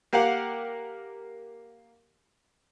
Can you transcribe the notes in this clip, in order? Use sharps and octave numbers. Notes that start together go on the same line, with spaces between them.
A#3 G4 A#4 F5 F#5